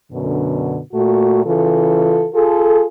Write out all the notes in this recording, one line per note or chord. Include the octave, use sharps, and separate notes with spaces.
F#2 B2 D3
A#2 A3 F#4
C#3 E3 F4 A4
F4 G#4 A4